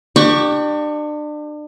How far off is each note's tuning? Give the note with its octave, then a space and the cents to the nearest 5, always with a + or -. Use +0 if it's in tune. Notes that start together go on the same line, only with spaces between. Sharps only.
D4 +35 G4 +0 C#6 +0